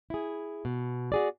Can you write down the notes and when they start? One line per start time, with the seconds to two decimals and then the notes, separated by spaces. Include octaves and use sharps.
0.10 E4 G#4
0.65 B2
1.12 F#4 G#4 D5